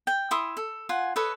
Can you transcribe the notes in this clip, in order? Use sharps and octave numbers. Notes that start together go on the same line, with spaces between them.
G5
E4 E5 C6 D#6
A4
F4 F#5 G#5
A4 B4 C#5 D#5